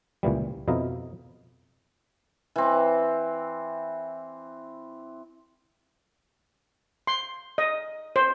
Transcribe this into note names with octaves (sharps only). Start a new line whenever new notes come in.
C#2 A#2 E3 G3
F2 B2 E4 D#5 F5 A#5
E3 C4
C6
D#5
C5